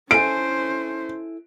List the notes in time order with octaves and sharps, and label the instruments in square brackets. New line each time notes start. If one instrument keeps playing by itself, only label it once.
[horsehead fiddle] C#4 C5 [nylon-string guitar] E4 A4 G#5 [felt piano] D7